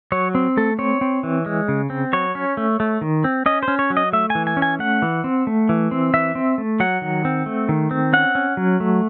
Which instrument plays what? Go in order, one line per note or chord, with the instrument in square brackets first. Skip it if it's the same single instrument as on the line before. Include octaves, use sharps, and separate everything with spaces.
[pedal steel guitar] F#3 C#5
C4
A3 A4
C4 C#5
C4
E3
G#3
C#3
C4
F#3 C#5
C#4
A3
A3
D#3
C4
C#4 D#5
C5
C#4
C#5
F#3
D#5
A3 E5
E3 G#5
G#5
C#4
G#5
A3 F#5
E3
C4
A3
E3
C4
E3 E5
C4
A3
F#3 F#5
D#3
C4
A3
D#3
C4
C#4 F#5
C#4
F#3
A3